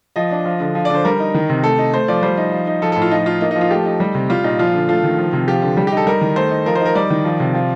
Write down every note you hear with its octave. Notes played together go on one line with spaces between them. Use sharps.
F3 D#5
D4
F3
D3
F3
D5
D3 C5
G3 A#4
D#4
D#3
C3
A3 A4
D#4
A3 C5
F3 D5
G3 C5
D#4
F3
D#4
F3 A4
A4
A2
F4
F3 D#4
D#4 F4
A#3 D#4
D#4
F3
F4
A3 G4
D#4
G3
C3
G3 F4
A#2 D#4
F3 F4
D3
A3 F4
D#3
F3
C3
F3 G4
D3
G3 G4
G4
D#4 A4
G3 A#4
D#3
A3 C5
D#4
F3 A#4
C5
D#4 A#4
G3 D5
D#3
F3
C3
F3